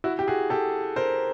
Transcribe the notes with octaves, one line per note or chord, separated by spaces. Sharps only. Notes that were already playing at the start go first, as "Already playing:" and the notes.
E4 F#4
G4
F#4 G#4
G4 A4
A#4 C5